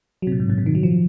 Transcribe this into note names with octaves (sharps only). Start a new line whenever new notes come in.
F#3
C3
A#2
G#2
A#2
C3
D#3
F#3
F3